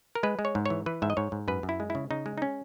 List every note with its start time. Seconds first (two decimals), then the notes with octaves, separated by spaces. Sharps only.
0.15 A#4
0.23 G#3 B4
0.39 G#3
0.45 C#5
0.55 G#2
0.66 E3 C#5
0.86 E3 B4
1.02 G#2 E5
1.10 D#5
1.17 G#2 C#5
1.32 G#2
1.48 F#2 B4
1.63 F#2
1.69 E4
1.80 G#3
1.90 E4
1.95 C#3
2.11 C#3 D#4
2.26 G#3
2.38 D#4
2.42 C#4